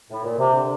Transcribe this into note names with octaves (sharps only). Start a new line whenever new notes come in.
A2
A#2
C3
D3